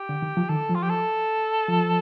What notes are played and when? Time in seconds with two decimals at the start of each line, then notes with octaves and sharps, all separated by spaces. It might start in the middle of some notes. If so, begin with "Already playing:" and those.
Already playing: G4
0.09 D3
0.22 D#3
0.37 F3
0.49 D#3 A4
0.70 F3
0.75 F4
0.83 G4
0.89 A4
1.68 F3